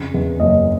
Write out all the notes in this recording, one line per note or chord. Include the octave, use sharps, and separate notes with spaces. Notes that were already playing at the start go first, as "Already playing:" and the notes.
Already playing: F2 C#3
E2
F#1 D#5